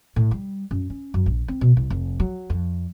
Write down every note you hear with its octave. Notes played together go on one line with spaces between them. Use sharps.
A2
G3
F#2
C#4
F#2
A#1
C4
B2
C2
F1
F#3
F2